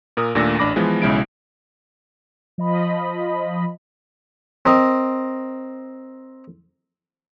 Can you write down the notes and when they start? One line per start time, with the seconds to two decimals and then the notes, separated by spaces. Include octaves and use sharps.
0.17 A#2 A#4 D#6
0.35 D#2 A#2 A3 D4 A4 A#6
0.59 A1 D4 B5 D6 A#6
0.76 E3 F3 G#3 B3
1.02 B1 C#3 G#3 E4 D7
2.58 F3 D#5 B5
4.66 C4 A#4 D#5